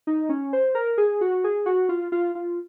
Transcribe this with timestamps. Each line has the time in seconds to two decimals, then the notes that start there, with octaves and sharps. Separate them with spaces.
0.07 D#4
0.29 C#4
0.53 C5
0.75 A#4
0.98 G#4
1.21 F#4
1.44 G#4
1.66 F#4
1.89 F4
2.12 F4
2.35 F4